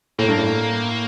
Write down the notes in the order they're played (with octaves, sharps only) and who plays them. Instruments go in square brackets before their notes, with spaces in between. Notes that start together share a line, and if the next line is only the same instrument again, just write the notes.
[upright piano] A2 [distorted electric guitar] A#3
[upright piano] G2
A2